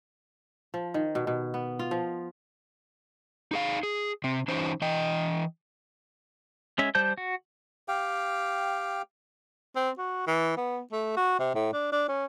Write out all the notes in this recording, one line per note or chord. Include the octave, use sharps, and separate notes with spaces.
F3
D#3
B2
B2
B3
F4
F3
D#4 G#4 F5
G#4
C3 C4
E3 C#4 D#4 C5
E3 D#5 G5
G#3 C#4 E5
G3 C5 A5 G6
F#4
G4 F5 G5
C4
F#4
E3
B3
A3
F#4
C3
A2
D4
D4
C#4